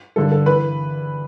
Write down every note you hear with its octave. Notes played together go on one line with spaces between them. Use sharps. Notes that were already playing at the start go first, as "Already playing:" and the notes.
G2 D3 A4
A4
E3 B4